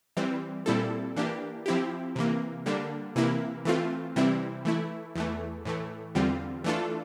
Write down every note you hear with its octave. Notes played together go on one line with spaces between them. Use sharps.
E3 G3 C4
A#2 G3 C4 E4 A4
E3 A#3 D4 G4
F3 C4 E4 G4
C3 E3 A#3
D3 G3 A#3 D4
C3 E3 A#3 E4
E3 A3 C4 F4
C3 E3 G3 C4 E4
E3 A3 E4
E2 E3 A3
A2 E3 A3
E2 D3 G3 C4 F4
E3 A3 D4 F4 A4